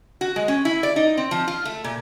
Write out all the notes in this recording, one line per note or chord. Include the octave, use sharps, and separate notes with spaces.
F#4
G#3
C#4
E4
D5
D#4
C4
F3
F4
A3
A#2